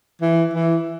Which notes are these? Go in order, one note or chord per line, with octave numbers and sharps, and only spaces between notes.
E3
E3